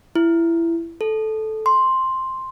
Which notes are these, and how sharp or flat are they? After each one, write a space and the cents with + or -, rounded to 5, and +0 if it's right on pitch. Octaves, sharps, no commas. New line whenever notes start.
E4 +20
A4 -10
C6 +5